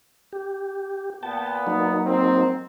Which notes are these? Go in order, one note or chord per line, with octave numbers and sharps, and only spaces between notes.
G4
A#2 B3 G5 A5
F#3 A#3 D#4
C4